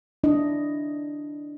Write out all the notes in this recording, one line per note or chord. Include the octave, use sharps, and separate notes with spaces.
D4 E4 D#5